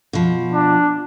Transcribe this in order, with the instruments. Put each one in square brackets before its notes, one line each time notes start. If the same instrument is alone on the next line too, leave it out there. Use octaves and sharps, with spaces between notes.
[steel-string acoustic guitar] B2 F3
[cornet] D4